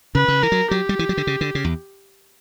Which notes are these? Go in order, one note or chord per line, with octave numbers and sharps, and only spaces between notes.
C#3 B4
C#3
E3 A#4
F#3
F#3 G4
G3
E3
F#3
D3
C#3
D3
C#3
E2